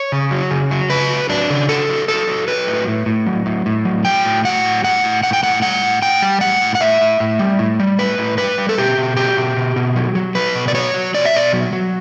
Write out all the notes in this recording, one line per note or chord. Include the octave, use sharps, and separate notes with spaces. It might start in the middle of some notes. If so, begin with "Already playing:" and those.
Already playing: C#5
C#3
F#3
C#3
F#3
C#3 B4
F#3
F#3 D4
C#3
F#3 A4
F#3
F#3 A4
F#3
F#3 B4
A2
A2
A2
F#3
A2
A2
F#3
F#3 G5
A2
F#3 F#5
A2
A2 F#5
A2
A2 F#5
G5
A2 F#5
G3 F#5
A2
A2 G5
G3
A2 F#5
A2
F#5
A2 E5
A2
A2
G3
A2
G3
A2 B4
A2
G3 B4
G3
A4
B2 G4
B2
F#3 G4
B2
B2
B2
F#3
F#3
F#3 B4
B2
D5
F#3 C#5
F#3
B2 D5
E5
B2 D5
F#3
F#3